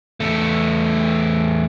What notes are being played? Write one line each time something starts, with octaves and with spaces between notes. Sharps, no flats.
E2 A3